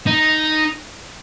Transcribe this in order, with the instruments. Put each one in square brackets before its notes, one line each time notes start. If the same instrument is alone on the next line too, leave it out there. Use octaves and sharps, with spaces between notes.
[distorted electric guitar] D#4